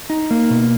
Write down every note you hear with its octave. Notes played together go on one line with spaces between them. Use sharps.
D#4
A#3
B2